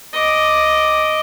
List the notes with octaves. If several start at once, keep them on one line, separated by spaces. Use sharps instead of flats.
D#5 D6